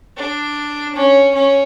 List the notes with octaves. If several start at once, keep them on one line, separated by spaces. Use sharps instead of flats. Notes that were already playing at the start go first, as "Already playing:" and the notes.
D4
C#4
C#4